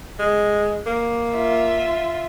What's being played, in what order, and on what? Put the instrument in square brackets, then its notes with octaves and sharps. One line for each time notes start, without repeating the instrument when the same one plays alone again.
[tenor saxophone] G#3
A#3
[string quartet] F4 E5